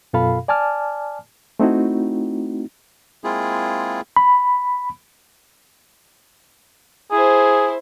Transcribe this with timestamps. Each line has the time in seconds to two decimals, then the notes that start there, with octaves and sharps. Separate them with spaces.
0.13 F#2 B2 F4 A4 F5 B5
0.48 D5 G#5 A5 D6 F6
1.60 A3 C4 D#4 E4 F#4
3.24 G#3 A#3 C4 E4 F4 G#4
4.16 B5
7.11 E4 G#4 C5